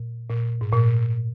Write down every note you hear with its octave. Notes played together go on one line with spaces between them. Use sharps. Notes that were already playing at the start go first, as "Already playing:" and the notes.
Already playing: A#2
A#2
G#2
A#2